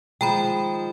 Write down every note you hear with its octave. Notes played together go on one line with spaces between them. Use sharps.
D#3 F3 G#3 G5 A#5 B5